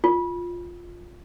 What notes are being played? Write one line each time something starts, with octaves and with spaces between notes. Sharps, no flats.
F4